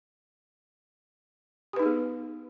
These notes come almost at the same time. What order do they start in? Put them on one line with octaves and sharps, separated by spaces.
G4 B4 D#4 G#4 B3